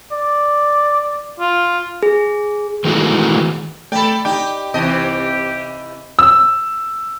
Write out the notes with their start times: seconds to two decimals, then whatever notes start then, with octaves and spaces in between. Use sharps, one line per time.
0.12 D5
1.40 F4
2.03 G#4
2.85 D#3 E3 G#3 A3 F#4
3.92 A3 A4 A#4 D5 G5 B5
4.25 D#4 G4 D5 G5 B5 D6
4.74 C2 C3 E3 C4 G4 D#5 A5
6.19 E6